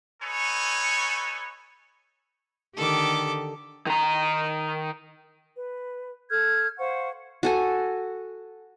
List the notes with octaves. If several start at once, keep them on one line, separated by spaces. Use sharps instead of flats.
D#4 A4 B4 C#5 G#5 C#6
D3 D#3 G4 A4 D6
D#3 A#5
B4
A4 F6 G6 G#6
C5 F5 F#5 C#6
F#4 A4 G#5